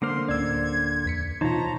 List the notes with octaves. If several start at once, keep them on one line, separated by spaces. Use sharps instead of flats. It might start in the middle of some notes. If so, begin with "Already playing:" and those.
D3 A#3 C5 C6 D6 F6
D1 C#4 D5 E6 G#6
E2 B6 C#7
B2 E3 D#4 F4 C5 C#5 A5 A#5